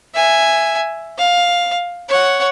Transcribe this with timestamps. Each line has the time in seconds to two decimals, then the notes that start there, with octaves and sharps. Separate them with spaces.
0.14 E5 G#5
1.18 F5
2.09 C#5 F#5